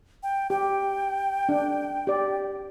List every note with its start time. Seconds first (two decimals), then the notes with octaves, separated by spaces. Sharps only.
0.23 G5
0.50 G4 G5
1.49 D4
2.07 G4 D5